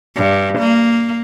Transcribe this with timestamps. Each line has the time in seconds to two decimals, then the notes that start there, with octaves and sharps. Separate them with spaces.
0.16 G2
0.59 A#3